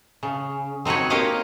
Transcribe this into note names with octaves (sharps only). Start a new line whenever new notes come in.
C#3
C4 D#4 F#4 B4 C#5
A#3 G4 C#5 D#5 F5